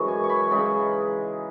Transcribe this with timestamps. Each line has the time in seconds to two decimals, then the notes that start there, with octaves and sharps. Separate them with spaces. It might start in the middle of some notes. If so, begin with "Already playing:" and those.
Already playing: F#2 E3 G#3 C#5 D#5
0.08 G#5
0.24 C#6
0.29 B5
0.50 C#3 E3 G#3 D#4 B5